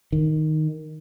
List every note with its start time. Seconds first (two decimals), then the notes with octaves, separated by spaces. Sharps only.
0.12 D#3